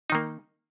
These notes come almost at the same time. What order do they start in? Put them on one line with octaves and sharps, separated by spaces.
D#4 D#3 A#3